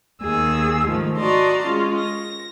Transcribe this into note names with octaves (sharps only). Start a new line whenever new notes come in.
D#2 G#4 E6
G#2 D#3 F3 A3
F#4 D5 D#5 A5 A#5 C6
G#3 C#4 F4
A#6